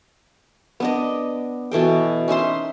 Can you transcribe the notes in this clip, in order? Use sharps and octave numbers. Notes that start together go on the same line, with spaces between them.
B3 D4 D#5
B2 E3 A4 G5
C#4 D#4 E5 C6